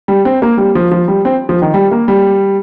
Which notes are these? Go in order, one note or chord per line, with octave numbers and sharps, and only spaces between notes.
G3
C4
A#3
G3
F3
F3
G3
C4
F3
D#3
G3
A#3
G3